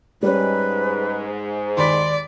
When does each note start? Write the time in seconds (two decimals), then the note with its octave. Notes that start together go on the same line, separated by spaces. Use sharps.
0.23 G#2 G3 C#4 B4
1.77 D#2 D5 B5 C6 B6